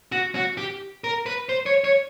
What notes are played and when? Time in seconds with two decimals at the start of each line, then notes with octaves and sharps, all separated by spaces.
0.12 F#4
0.35 F#4
0.57 G4
1.04 A#4
1.26 B4
1.49 C5
1.66 C#5
1.84 C#5